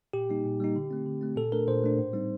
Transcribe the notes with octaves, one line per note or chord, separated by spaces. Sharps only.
A#2 G4
G3 A#3 D#4
A#2
G3 A#3 D#4
D3
A3 C4
D3
A3 C4
A#2 A4
A3 D4 A#4
A#2 C5
A3 D4
A2
G3 C4 D#4